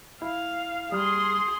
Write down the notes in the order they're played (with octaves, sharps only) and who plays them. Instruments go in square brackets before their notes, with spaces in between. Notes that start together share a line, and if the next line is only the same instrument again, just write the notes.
[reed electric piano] E4 [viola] F5
[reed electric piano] G3 F6 [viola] G#4 C6 [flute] D#6